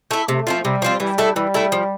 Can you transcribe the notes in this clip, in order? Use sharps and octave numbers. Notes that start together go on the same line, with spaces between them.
A3 E4
C3 A3
F3 C4 F4
C3 G3
F3 C4 F4
E3 G3
A3 E4 A4
E3 G3
A3 E4 A4
F3